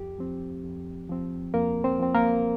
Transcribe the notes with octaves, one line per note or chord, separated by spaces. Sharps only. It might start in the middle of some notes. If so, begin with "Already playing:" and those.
Already playing: F2 G4
F3 C4
F2
F3 C4
F2 A#3 A#4
C4 C5
F3 C4
A#3 A#4